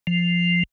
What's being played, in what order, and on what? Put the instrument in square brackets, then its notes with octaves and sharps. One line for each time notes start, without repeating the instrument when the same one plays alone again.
[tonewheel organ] F3